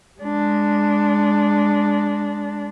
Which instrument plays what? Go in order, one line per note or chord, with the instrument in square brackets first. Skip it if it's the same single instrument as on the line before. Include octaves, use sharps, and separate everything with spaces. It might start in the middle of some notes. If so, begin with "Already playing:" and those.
[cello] G#3 D4